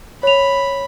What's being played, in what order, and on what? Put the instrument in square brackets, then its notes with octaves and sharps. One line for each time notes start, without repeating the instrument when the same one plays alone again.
[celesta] C#5 F7 [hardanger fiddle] B5